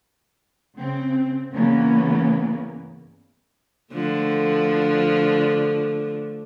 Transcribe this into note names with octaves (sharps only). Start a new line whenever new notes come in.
C#3 C4
G2 C#3 E3 A#3 B3 C#4
D3 F3 A3